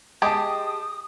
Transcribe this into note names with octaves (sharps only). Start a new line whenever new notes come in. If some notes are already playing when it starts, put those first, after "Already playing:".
G#3 G4 G#4 D#5 G5 A5 D#6